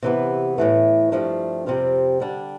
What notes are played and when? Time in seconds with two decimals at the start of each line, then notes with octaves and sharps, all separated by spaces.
0.02 C3 E3 B3
0.58 A2 E3 A3
1.12 G2 F3 A3 D4
1.66 F2 C3 G3 C4 F4
2.20 D3 G3 D4